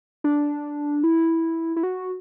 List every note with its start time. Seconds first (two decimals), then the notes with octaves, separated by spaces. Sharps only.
0.24 D4
1.04 E4
1.76 E4
1.83 F#4